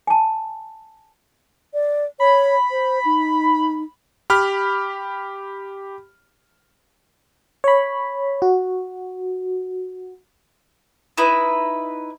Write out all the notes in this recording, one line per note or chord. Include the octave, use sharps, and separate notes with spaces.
G#5 A5
D5
C#5 B5
C5
D#4
G4 B5 F6
C#5 B5
F#4
D#4 E4 B4 B5